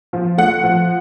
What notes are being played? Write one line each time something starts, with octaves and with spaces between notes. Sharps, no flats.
F3
A3 F#5
F3